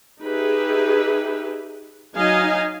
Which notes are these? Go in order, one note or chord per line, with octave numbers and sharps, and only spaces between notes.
D#4 G4 G#4 B4 E5
F#3 D#4 D#5 F5 G#5